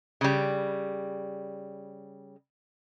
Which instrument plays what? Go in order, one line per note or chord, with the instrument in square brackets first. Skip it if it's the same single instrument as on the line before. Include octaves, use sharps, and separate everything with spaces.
[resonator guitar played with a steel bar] C#3 G3